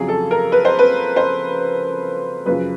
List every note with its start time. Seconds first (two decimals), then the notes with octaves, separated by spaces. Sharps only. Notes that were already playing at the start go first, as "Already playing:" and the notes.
Already playing: F2 C#3 F#3 G#4
0.08 A4
0.31 A#4
0.52 B4
0.65 C5
0.79 B4
1.16 C5
2.46 F#2 C#3 F3 B4